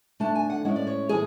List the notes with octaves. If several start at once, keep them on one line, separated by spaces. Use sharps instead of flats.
D3 A3 D4 A5
G#5
F#5
A2 G#3 C#4 E4 C#5
D5
C#5
A2 E3 B3 G#4